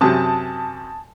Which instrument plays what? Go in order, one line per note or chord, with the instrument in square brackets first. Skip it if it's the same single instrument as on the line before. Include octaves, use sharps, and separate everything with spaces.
[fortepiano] F#2 C3 [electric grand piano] G#5 A5 D#6